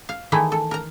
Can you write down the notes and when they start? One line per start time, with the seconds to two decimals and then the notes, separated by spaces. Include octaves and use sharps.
0.09 F5
0.32 D#3 E3 G#3 A3 D#4 E4
0.52 A4
0.71 A#4 A#5